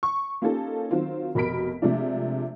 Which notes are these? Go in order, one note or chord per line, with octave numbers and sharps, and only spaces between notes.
C#6
A#3 C#4 D#4 F4 G4 A4
D#3 F#3 C4 F4
F1 B2 A#4 B5 B6 D7
C3 F3 G#3 A3 D4